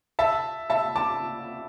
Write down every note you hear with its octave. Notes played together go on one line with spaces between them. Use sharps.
E5 A5
E5 A5
A5 D6